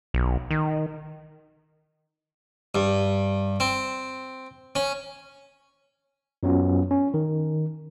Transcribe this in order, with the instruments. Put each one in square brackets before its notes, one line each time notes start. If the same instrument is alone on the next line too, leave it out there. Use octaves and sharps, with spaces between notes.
[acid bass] B1
D#3
[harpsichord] G2
C4
C#4
[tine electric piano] F#2 F#3 B3 C#4 F4
C#4
D#3